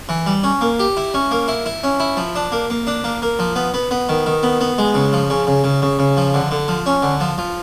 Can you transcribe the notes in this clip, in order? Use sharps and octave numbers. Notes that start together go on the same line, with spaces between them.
E3
G3
C#4
A#3
G4
E4
C#4
A#3
E4
E4
C#4
E4
F3
D4
A#3
A#3
D4
A#3
A#3
F3
B3
B3
B3
D#3
D#3
B3
B3
G#3
C#3
F3
C#3
C#3
C#3
C#3
C#3
F3
D3
D3
F3
C#4
D3
F3
F3